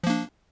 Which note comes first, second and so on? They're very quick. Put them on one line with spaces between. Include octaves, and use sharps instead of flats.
F3 A#3 D4